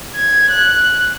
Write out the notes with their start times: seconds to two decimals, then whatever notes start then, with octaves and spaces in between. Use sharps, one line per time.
0.14 G#6
0.50 F#6